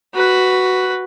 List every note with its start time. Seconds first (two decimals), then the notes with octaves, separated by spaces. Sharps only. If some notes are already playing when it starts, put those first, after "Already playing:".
0.14 F#4 B4